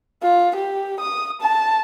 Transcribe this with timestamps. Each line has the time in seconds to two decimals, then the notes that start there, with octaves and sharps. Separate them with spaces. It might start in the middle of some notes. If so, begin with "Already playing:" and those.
0.23 F4
0.56 G4
1.00 D#6
1.41 A5